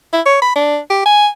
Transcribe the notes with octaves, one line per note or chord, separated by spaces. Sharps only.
E4
C#5
B5
D4
G4
G#5